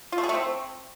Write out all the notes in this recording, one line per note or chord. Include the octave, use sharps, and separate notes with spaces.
F4
A3
G#4
A3
C4